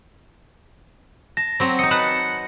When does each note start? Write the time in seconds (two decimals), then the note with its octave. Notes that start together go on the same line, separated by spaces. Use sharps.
1.37 A5 A#6
1.60 F#3 C4
1.79 D#4 D#5 C#7
1.91 B4 F#5 A5